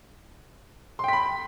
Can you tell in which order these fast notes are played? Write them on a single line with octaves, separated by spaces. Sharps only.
C6 G5 B6 B5